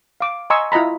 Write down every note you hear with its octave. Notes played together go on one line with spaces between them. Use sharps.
F5 D6
D#5 G#5 A#5 C6 C#6 E6
E4 F4 D#5 A#5 B5